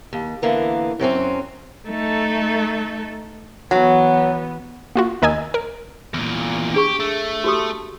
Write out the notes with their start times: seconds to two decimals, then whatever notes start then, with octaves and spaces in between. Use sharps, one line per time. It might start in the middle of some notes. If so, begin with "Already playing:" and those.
0.13 D#2
0.42 D3 E3 A#3 B3
0.99 F#2 F#3 C4 C#4
1.89 A3 D#4 A4
3.71 E3 F#3 B3
4.96 A#3 F4 F#4
5.22 D#2 A#4 D#5 G#5 E6
5.54 A#4
6.14 E2 A#2
6.74 D4 G4 G#4 C#6
7.00 A3
7.44 F#4 G4 D#6